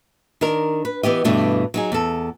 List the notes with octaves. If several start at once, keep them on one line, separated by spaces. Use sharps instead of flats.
D#3 D4 A#4
B4
E3 B3 G4 D#5
G2 B2 E3 A3 D4
F#3 D#4 G#4
E2 A4